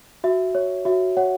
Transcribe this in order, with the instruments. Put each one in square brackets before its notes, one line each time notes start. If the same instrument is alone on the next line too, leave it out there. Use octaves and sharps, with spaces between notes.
[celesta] F#4 E5
C#5
F#4 E5
C#5 F#5